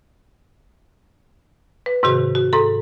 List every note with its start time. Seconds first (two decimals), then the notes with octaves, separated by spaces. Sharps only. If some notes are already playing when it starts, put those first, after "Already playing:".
1.86 B4
2.03 G#2 C3 D#3 F#4
2.35 F#4
2.53 G#2 A4 A#5